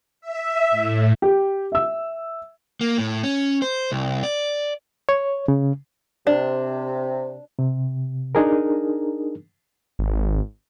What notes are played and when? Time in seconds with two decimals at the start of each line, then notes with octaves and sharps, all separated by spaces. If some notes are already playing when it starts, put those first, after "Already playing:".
0.21 E5
0.71 A2
1.22 G4
1.72 E5 E6
2.81 A#3
2.98 A2
3.23 C#4
3.62 C5
3.92 C2
4.23 D5
5.09 C#5
5.48 C#3
6.27 C3 D4
7.59 C3
8.35 D4 D#4 G#4 A#4
9.99 G#1